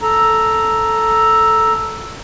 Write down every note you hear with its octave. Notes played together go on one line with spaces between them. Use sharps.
A4 A#5